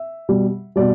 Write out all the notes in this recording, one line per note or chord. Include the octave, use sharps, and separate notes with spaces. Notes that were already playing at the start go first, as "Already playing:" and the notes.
Already playing: E5
B2 G3
B2 G3 D5